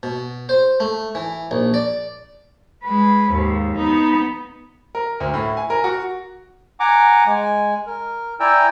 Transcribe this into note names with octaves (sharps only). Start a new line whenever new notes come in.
B2
C5
A3
E3
A#1
D5
G#3 B4
D#2 G#2
B3 D#4
A#4
D2
A2
G#5
A#4
F#4
F#5 G#5 A#5 D6
G#3 G#5
A#4
E4 D5 G5 G#5 A#5 E6